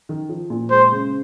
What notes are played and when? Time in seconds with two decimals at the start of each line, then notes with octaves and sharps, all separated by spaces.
0.09 D#3
0.29 F3
0.50 A#2
0.70 G#3 C5
0.92 C#3